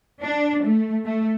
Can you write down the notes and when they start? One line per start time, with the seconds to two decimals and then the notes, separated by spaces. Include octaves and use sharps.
0.22 D4
0.65 A3
1.05 A3